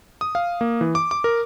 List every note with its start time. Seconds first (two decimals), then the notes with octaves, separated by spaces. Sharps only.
0.21 D#6
0.35 F5
0.61 A#3
0.81 E3
0.95 D6
1.11 D6
1.24 A#4